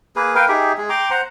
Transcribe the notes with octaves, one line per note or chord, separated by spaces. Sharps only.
A#3 G#4 B4
A#4 B4 F5 G5
D#4 G4 G#4 E5
G#3 G#4
G5 A#5 C6 D6
C5 F#5 A#5